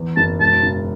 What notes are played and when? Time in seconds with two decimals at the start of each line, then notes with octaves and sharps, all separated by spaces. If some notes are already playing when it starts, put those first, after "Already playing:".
Already playing: E2
0.16 F#1 A5
0.40 E1 A5
0.63 C#3